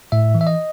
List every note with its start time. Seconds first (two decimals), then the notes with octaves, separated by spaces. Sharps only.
0.12 A2 E5
0.35 E3
0.41 E5
0.47 D#5